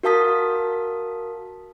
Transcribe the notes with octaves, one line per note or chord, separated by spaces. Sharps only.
F#4 A#4 F5 A5 D#6 B6